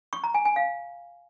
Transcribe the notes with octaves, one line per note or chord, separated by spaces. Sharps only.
C#6
A#5
G#5
G#5
F5